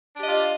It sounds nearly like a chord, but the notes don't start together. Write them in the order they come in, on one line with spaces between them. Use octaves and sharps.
D4 G4 D#5 F4